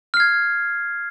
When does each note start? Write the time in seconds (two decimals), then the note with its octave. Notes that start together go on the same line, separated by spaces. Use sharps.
0.14 F6
0.17 C7
0.20 G#6